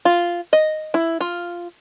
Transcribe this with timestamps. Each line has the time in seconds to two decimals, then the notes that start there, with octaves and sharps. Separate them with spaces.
0.05 F4
0.53 D#5
0.94 E4
1.21 F4